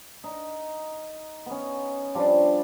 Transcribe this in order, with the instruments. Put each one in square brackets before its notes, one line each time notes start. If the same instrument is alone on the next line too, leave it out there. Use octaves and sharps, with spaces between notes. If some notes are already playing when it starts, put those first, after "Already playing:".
[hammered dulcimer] D#4
B3 C#4
F3 G3 D4